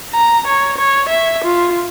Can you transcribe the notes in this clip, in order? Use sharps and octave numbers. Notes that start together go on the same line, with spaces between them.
A#5
C#5
C#5
E5
F4